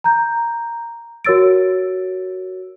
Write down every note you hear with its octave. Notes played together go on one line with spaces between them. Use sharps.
A#5 G6
F#4 A#4 C#5 E6 A6 D7